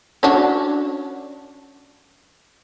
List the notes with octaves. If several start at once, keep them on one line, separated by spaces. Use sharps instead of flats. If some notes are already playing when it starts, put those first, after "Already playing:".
C#4 D4 F#4